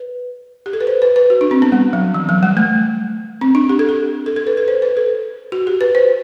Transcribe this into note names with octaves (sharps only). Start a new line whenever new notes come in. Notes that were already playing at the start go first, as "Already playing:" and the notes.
Already playing: B4
G4
A4
B4
C5
B4
B4
F#4
D4
C4
B3
G3
F#3
E3
F#3
G3
A3
C4
D4
G4
A4
G4
A4
A4
B4
A4
C5
B4
A4
F#4
G4
B4
C5